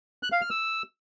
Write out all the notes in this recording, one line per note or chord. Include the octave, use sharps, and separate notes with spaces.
F#6
F5
F6
E6